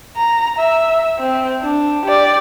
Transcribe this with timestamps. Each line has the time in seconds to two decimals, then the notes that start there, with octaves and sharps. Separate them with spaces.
0.17 A#5
0.59 E5
1.19 C4
1.62 D4
2.07 G4 D5